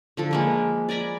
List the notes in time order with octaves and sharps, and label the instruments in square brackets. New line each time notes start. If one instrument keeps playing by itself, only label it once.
[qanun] D3 F3 A4
G#3 A#3 B4
D5 G#5 A#5 B5